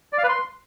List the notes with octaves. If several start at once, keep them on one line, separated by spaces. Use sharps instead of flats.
D5
F5
B4
C6